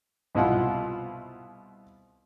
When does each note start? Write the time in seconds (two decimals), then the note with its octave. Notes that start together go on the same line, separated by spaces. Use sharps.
0.35 C2 B2 E4 F4 F#5